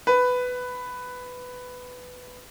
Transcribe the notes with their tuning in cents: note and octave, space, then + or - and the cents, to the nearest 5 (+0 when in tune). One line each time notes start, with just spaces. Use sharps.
B4 +10